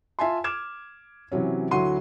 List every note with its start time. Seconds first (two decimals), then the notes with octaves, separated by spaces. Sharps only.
0.19 F4 E5 G#5 A5 C6
0.44 D6 F6 G#6 E7
1.32 C3 E3 F#3 C#4
1.71 D2 F#3 E4 F#4 C6 D#7